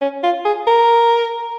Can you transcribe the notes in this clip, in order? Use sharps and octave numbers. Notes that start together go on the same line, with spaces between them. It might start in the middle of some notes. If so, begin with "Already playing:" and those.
C#4
F4
G#4
A#4